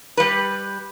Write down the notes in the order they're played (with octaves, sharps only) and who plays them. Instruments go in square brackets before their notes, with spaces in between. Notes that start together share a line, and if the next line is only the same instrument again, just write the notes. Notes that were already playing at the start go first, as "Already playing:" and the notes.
[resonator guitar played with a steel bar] G3 B4